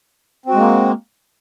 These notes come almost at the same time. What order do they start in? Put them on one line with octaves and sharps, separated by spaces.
C4 F#4 G#3 A#3